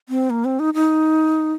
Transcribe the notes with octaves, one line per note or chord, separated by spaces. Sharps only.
C4
A#3
C4
D#4
D#4